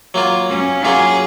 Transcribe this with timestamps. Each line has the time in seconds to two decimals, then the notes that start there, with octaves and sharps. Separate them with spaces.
0.14 F#3 A#3 F4
0.49 C#4
0.85 F#3 A#3 F4 G#4